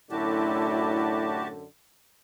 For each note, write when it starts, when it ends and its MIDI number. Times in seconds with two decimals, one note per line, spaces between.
0.11 1.64 42
0.11 1.52 45
0.11 1.64 50
0.11 1.44 64
0.11 1.48 66
0.11 1.48 67
0.11 1.48 81